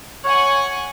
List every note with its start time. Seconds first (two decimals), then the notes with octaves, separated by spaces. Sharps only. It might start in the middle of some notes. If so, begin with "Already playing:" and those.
0.24 C#5 F#5 G#5